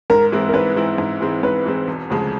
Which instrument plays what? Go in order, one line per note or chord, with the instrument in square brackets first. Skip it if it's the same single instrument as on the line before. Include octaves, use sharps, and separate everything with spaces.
[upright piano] G#2 [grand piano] A#4
[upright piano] E3 G#3 C4 E4
[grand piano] A#4
[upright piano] G#2 [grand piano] B4
[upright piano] E3 G#3 C4 E4
G#2
E3 G#3 C4 E4
[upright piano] G#2 [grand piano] B4
[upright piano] E3 G#3 C4 E4
E1
D2 C#3 F3 G#3